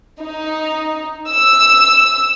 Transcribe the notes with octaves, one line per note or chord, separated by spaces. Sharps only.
D#4
E6